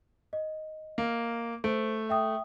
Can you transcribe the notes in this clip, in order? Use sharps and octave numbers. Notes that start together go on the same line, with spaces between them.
D#5
A#3
A3 C5 D7
E5 G5 D#6